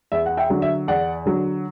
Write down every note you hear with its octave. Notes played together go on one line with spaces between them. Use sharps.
E2 E5
F#5
E5 G5
D3 F#3
E5
E2 D5 F#5
D3 F#3